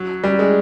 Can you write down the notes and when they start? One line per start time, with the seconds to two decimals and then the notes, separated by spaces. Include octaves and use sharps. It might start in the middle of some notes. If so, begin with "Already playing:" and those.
Already playing: F#3
0.24 G3
0.39 G#3